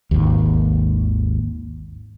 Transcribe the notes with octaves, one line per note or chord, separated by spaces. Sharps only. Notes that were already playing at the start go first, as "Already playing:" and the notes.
G#1 D#2